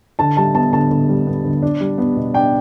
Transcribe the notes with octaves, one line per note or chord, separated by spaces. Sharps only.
D3 A5
G3 A5
B3 A5
D3 A5
D3
G3
B3
D3
D4
G3
B3
B2
D4 G5